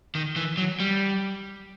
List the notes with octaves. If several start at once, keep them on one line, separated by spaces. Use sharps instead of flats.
D#3
E3
F#3
G3